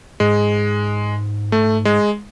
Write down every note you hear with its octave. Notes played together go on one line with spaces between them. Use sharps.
G#2 G#3
A3
G#3